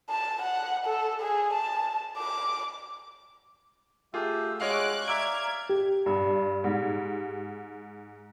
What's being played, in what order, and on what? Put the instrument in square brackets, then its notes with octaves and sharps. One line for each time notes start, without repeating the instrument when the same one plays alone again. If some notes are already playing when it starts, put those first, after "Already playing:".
[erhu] A5
F#5
A4
G#4
A5
D6
[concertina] A3 G4 [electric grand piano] F4 G#4 [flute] E6
[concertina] G#3 F#4 [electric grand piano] C#5 D#5 F5 [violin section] D6 F#6
[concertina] D5 F5 [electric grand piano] E5 E6 D7 [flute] A#5 [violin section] G#6
[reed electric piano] G4
[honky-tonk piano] G2
G#2